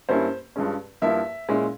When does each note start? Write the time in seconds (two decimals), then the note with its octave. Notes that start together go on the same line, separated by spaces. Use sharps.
0.09 G2 G3 A#3 C#4 E4 C5
0.56 G2 F3 G#3 C#4
1.02 G2 F3 A#3 E4 E5
1.49 A#2 G#3 C#4 E4